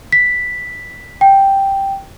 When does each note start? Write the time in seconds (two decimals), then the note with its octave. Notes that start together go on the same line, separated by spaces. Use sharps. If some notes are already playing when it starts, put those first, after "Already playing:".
0.12 B6
1.21 G5